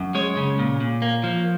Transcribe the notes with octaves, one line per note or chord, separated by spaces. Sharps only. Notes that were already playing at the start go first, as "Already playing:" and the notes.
Already playing: F#2
G#3 C#5
C#3
A#2
A#2
A#3
F3